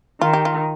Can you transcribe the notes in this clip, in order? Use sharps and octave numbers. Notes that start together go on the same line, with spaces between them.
D#3 F4
G4
F4